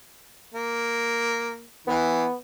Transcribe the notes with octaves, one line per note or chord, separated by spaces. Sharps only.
A#3
E3 B3